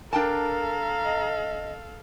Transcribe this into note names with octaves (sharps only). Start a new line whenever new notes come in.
D4 A4 A#4 F5 G5 A5 A#5
D#5